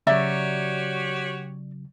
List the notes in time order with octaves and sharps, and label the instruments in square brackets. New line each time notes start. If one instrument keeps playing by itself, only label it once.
[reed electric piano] C#3 F#3 [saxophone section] F#4 G4 C#5 [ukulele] D5 E5 A#5